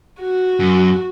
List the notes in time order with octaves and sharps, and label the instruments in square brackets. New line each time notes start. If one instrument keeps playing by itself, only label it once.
[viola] F#4
[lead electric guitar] F#2